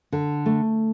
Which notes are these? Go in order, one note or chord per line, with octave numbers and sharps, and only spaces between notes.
D3
A3